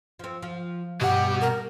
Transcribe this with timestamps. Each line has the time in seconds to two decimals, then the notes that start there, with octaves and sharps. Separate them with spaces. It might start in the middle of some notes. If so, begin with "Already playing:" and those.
0.19 F3 C4
0.42 F3
1.01 G2 B2 G4 F#5
1.41 A#4